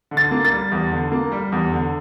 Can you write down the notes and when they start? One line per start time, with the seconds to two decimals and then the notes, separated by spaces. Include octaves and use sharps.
0.11 D3
0.17 A6
0.31 A#3
0.45 A6
0.51 G3
0.72 E2
0.92 D3
1.12 A#3
1.32 G3
1.52 E2
1.72 D3